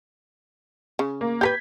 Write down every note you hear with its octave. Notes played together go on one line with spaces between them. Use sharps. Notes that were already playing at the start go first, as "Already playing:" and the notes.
C#3
A#3
G4 A#4 B4 G6 G#6 B6